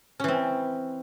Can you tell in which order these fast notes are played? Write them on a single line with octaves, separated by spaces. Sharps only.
C#4 E3 C4